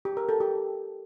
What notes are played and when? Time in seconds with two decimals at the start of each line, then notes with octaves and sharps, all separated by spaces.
0.05 G4
0.17 A#4
0.29 A4
0.40 G4